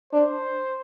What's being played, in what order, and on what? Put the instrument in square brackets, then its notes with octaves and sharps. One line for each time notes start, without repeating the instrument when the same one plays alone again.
[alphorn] D4 [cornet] C5